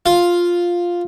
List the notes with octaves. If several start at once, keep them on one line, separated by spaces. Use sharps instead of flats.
F4